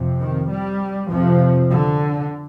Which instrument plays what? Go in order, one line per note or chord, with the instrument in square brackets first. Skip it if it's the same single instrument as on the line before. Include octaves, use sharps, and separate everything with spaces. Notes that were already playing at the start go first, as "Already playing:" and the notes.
Already playing: [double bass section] F2 C3
D#3
G3
F2 C3 F3
D3